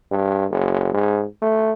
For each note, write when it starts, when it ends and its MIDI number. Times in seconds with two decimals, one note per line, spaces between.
0.11 0.45 43
0.51 0.92 30
0.93 1.24 44
1.42 1.72 57